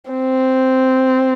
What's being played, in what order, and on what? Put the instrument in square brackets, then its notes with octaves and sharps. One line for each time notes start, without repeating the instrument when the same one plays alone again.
[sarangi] C4